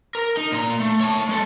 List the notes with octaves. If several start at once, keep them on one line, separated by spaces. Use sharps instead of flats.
A#4
D#4
A#2 A#5
A3
C#5 A5
G#3 A4